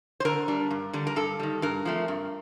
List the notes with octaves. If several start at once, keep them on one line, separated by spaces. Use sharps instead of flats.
C5
D3 A#4
G3 D4
G2
D3 G3 D4
A#4
G2 A4
D#3 G3
G2 A#4
F3 A3 C4
G2